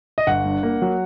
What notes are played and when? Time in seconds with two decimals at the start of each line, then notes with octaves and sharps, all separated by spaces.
0.18 D#5
0.27 G1 F#5
0.45 G2
0.63 A#3
0.82 F#3